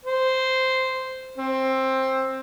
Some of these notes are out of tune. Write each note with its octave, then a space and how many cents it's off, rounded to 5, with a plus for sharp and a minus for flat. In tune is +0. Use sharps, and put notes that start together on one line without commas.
C5 -5
C4 +15